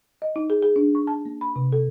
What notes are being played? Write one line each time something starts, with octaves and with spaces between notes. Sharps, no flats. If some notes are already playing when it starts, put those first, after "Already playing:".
D#5
D#4
G#4
G#4
D4
C#6
A5
A#3
B5
C3
A4